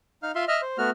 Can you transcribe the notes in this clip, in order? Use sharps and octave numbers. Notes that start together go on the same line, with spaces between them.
D#4 F5 F6
F4 E5 F5 C6
D#5 E5 F6
C5
A3 B3 F#4 F6